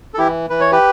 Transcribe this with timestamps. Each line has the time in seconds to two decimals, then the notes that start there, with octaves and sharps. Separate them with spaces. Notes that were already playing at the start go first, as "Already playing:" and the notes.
0.14 A4
0.18 E3 E4 G4
0.50 E3 B4
0.60 C#5
0.72 G4 B4